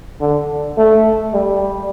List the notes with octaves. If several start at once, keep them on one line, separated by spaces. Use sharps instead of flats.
D3
A3
G3